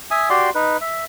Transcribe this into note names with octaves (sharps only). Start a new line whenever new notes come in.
E5 G#5 D#6
F#4 G4 D5 C6
D#4 B4
E5